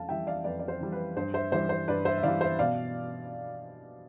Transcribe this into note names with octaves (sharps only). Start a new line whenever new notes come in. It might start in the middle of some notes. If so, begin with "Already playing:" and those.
Already playing: F2 F5 A5
E3 G3 E5 G5
D5 F5
F2 B4 D5
D5
C5
E3 G3
B4
G2 C5
C5 E5
E3 G3 C5 E5
C5
G2 B4 D5
C5 E5
E5
E3 G3 D5 F5
C5 E5
B2 D5 F5